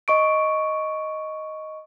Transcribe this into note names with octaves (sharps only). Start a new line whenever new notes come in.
D#5 C#6 D7